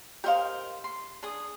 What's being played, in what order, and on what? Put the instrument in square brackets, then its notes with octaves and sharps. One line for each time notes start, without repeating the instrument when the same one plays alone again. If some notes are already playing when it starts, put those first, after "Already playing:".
[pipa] G4 D#5 F5 [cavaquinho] A#4 C5
[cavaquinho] C6
[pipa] D4 [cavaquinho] G#4 D#6